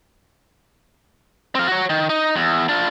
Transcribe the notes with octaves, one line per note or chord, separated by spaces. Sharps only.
C4 F5
F#4 C#5
D#3
D#4
E2
D4 F4